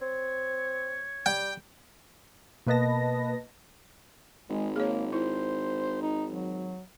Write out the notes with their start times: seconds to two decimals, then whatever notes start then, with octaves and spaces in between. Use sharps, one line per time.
0.01 C4 C#5
1.26 G3 G5
2.66 B2 A#3 B4 D#5 A5 A#6
4.50 G#1 G#3
4.76 A#3 G#4 C#5
5.13 E4 C5
6.02 D#4
6.30 F#3